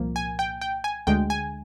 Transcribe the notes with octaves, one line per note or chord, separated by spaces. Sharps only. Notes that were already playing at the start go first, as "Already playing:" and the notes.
Already playing: C2 A#2 F3 A#3
G#5
G5
G5
G#5
D2 D3 G#3 G5
G#5